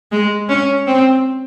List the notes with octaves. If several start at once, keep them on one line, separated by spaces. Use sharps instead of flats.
G#3
C#4
C4